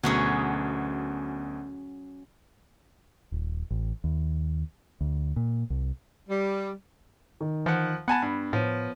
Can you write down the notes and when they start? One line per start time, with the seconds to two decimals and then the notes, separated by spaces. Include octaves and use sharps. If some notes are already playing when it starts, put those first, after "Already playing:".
0.03 D2 B2 F#3 C#4 G#4
3.32 D#1
3.71 A1
4.04 D#2
5.01 D2
5.36 A#2
5.70 C2
6.29 G3
7.40 D#3
7.66 E3 F3 F#5
8.08 B3 F#5 G#5 A5 B5
8.22 G2
8.53 A2 F3 B3 C#5 D#7